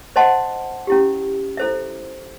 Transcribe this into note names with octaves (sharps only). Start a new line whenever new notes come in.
C5 D#5 F#5 A5 C6
C#4 E4 G4
E4 A4 C5 E5